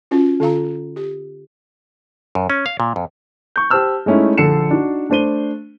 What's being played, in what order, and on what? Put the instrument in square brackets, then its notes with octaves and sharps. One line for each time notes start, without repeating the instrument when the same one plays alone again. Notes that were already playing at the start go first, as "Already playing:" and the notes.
[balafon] C#4 F4 F#4
D3 F4 F5 A#5
G4
[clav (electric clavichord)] F#2
C#4
F5
A#2
F2
[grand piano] C#6 G6
G4 C5 A5 E6 F6
G#3 A3 C#4 D#4 E4
A#1 D3 A4 C7 C#7 E7
D4 D#4 F#4
A3 D4 C5 D#7 G7